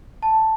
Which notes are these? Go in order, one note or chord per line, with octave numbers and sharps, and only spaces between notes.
A5